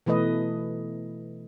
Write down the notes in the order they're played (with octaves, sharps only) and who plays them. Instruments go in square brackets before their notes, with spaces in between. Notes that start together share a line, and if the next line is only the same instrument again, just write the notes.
[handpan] B2 E3 A3 B4 D#5